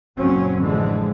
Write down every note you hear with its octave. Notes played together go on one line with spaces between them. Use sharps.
F#1 F#2 A#2 F#3 C4 C#4
A1 D3 E3 F3 G#3